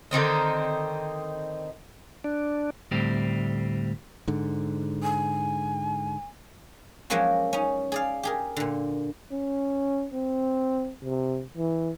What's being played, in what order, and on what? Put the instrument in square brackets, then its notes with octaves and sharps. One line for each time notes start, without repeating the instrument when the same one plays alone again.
[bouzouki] D3 D#3 C4 D#4
[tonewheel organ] D4
[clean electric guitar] D2 A2 G3 C4
[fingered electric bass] G#2 D3
[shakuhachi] G#5
[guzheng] F3 F#3 G#3 A#3 C#4 F#4
C#4 D#4
G#4 D5 F5
G4 G#4 A#4
A#2 D3
[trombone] C#4
C4
C3
E3